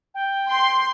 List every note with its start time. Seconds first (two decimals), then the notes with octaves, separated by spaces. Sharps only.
0.14 G5
0.49 C6